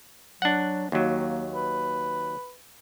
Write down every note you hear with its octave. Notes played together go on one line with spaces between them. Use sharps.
F#3 D4 F#5
D#2 F#3 A#3
B4